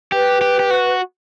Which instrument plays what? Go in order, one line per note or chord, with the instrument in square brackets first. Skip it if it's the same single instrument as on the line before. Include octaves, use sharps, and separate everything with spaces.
[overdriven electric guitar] G4 [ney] B4
[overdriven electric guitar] G4
G4
F#4